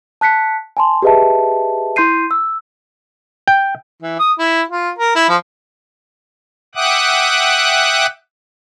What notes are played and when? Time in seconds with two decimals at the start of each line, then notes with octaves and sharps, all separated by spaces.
0.21 A5 F#6 B6 C#7
0.77 G#5 A5 C6
1.02 G4 G#4 B4 D#5 E5 A5
1.96 E4 C6 G6 C7 D#7
2.31 E6
3.48 G5
4.02 E3
4.19 D#6
4.39 E4
4.71 F4
4.98 A#4
5.15 E4
5.29 F3
6.75 E5 F#5 G5 D6 D#6 F#6